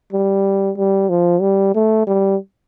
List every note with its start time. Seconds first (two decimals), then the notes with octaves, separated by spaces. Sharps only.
0.13 G3
0.77 G3
1.10 F3
1.41 G3
1.75 A3
2.07 G3